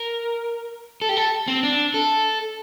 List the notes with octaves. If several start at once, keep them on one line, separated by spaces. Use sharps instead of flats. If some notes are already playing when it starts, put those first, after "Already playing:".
Already playing: A#4
A4
G4
A4
C4
D4
A4